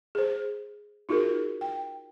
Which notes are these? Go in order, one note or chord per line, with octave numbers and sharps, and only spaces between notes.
G#4 C5
D#4 F4 F#4 G#4 A#4
G5